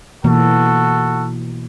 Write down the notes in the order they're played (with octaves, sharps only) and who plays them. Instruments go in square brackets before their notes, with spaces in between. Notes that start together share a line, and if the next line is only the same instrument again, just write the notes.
[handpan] B2 E3 A#3 [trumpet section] F#4 A4